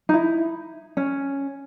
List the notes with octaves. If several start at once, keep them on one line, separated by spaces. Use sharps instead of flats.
D#4
E4
C#4